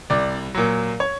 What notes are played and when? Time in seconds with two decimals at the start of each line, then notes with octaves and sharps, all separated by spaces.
0.10 C2 D5
0.55 A#2 F#3
1.00 C#5